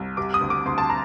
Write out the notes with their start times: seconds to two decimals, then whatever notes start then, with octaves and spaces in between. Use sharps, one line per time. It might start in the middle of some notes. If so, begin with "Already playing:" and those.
Already playing: C2
0.17 C3 D6
0.34 D#6
0.41 D2
0.50 D6
0.66 D2 C6
0.78 A5
0.90 A#5